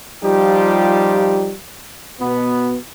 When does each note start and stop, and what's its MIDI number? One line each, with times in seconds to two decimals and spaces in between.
0.24 1.54 53
0.24 1.54 55
0.24 1.54 63
0.24 1.54 65
0.24 1.54 67
2.21 2.76 47
2.21 2.76 59